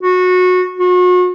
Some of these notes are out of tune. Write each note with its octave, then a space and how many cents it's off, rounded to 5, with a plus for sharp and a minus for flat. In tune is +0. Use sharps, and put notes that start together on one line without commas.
F#4 -20
F#4 -40